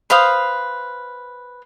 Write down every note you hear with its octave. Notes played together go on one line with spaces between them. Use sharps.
B4 C5 F5 D#6